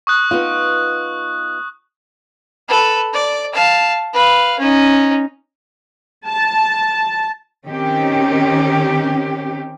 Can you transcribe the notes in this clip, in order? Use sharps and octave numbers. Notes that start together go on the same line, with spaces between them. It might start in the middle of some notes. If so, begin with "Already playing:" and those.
C#6 D#6 F#6
B3 D#4 F4
A4 B4
D5
F5 A5
B4 F5
C#4 D#4
A5
D#3 C4 C#4 G4